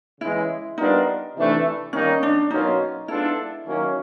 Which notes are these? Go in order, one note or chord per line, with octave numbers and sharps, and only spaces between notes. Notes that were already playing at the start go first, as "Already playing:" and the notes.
C#3 E3 G#3 E4
G3 B3 D4 D#4 F4 A#4
C3 E3 A3 D4
D#3 G3 A#3 C#4 D#4
D4
B2 F#3 A#3 C#4 D#4 F4
G#3 B3 D4 E4 F4 A4
D#3 F#3 A#3 C#4